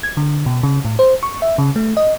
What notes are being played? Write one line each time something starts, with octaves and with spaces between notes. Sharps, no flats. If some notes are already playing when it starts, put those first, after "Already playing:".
G#6
D3
B2
C#3
A2
C5
C#6
E5
C#3
A3
D#5